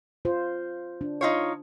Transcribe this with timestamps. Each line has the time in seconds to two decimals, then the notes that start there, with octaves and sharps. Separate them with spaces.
0.25 F4 C5
1.01 D4
1.21 D#4 F4 C#5